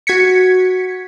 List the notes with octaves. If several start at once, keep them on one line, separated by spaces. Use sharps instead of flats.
F#4 G#6 B6 C#7